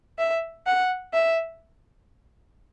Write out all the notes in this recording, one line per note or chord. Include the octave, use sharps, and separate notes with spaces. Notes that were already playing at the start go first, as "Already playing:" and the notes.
E5
F#5
E5